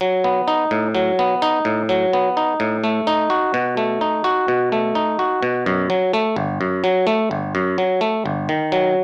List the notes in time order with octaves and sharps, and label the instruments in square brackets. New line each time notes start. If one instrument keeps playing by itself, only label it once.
[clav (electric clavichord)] F#3
B3
D#4
A2
F#3
B3
D#4
A2
F#3
B3
D#4
A2
A3
D#4
F#4
B2
A3
D#4
F#4
B2
A3
D#4
F#4
B2
F#2
F#3
A3
G1
F#2
F#3
A3
G1
F#2
F#3
A3
G1
D#3
F#3